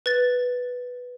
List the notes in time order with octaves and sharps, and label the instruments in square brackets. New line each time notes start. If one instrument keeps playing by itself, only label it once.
[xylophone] B4 A6